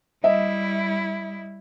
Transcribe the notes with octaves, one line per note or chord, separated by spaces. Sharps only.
G3 E4 D#5 E5